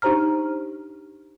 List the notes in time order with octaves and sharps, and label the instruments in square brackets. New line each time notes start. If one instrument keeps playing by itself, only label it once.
[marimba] D4 D#4 G4 C5 A#5 F6